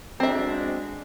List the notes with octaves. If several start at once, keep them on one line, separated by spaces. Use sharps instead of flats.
G#3 C4 D4 F#4 E5